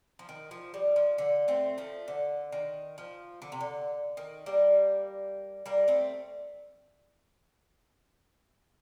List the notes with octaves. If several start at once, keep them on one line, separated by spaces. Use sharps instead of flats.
F3
D#3
F3
G3
F3
D3
A3 C4
F3 A3
D3
D#3
F3
D3
C3
D3
D#3
G3 A#3
G3 A#3
A3 C4